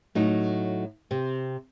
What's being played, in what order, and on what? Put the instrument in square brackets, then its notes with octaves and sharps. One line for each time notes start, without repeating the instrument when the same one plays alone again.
[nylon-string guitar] A2 F#3 D#4
C3 C4